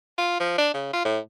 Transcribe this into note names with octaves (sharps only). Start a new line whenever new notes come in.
F4
F3
D4
C#3
F4
A2